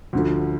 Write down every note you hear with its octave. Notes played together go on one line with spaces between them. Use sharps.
D2 D3 F3